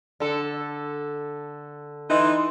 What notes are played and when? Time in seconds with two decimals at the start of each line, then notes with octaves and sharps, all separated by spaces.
0.20 D3 A4
2.10 E3 D#4 C6